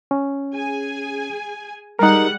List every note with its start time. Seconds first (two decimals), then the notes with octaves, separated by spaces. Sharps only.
0.11 C#4
0.54 G#4 G#5
1.99 G3 G#3 D#4 A#4 F#5